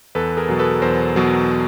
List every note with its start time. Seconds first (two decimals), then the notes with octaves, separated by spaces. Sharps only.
0.15 E2 A4 B4
0.37 G#4 A#4
0.49 B2 F#3
0.59 A4 B4
0.82 E2 A#4 C5
1.16 B2 F#3